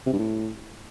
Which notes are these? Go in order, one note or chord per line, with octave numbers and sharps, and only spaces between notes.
C3
G2
A2